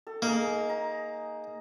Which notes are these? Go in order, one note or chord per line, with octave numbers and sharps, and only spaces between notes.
A4
A#3 D#4 G#4
A#5